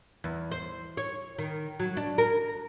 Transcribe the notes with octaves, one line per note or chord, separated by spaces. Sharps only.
E2
C5
C#5
D#3
F#3
D4
A#4